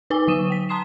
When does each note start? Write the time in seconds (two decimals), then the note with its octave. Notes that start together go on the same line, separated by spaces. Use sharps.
0.10 D#4 B4 G#5 D6 E6 G7
0.27 D3 F#3 C#6 D#6 D#7 E7
0.50 G5 B6
0.69 A5 A#5 C6 D#6 C7 E7